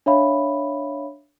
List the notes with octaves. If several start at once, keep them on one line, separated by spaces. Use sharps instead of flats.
D4 C#5 E5 F5 B5